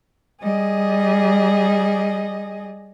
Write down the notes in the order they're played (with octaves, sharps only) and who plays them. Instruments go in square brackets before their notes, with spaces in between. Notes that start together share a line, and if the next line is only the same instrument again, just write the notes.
[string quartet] G3 G#4 D#5